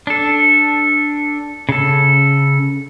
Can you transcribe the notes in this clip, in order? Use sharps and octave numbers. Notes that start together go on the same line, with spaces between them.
D4 A4
C#3 A4